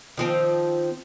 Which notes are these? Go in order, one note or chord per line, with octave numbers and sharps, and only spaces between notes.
D#3 F3 C4